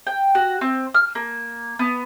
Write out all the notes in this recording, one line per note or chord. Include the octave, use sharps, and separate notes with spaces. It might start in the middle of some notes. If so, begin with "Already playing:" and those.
G5
F#4
C4
F6
A#3
B3